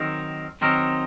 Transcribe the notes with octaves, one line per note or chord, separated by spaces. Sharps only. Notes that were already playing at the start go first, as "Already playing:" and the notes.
Already playing: D#3 F#3 C4 D#4 A#4
D#3 F#3 C4 D#4 A#4